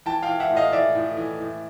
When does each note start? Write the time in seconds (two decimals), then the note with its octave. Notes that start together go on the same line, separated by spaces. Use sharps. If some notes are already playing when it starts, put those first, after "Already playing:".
0.06 E3 G5 A5
0.23 F5 G5
0.29 E3
0.40 E5 F#5
0.51 A2
0.57 D#5 F5
0.73 E3 D5 E5
0.95 A2
1.17 E3
1.40 A2